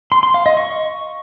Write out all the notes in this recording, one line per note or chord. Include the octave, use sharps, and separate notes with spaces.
C6
C6
F5
D#5
C#6